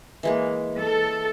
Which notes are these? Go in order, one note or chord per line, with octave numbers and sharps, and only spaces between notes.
E3 G#3 A#3
A4